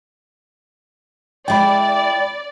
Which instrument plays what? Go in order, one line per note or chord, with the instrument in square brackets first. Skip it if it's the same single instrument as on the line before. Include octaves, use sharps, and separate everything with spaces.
[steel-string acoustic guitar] G#3 E4 [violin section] D5 [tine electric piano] G5 B5